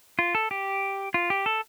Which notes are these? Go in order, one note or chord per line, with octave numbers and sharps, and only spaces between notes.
F4
A4
G4
F4
G4
A4